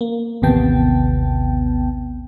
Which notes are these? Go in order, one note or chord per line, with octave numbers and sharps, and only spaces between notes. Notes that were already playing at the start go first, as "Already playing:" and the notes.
A#3
A1 D#2 C3 B3 G5 A5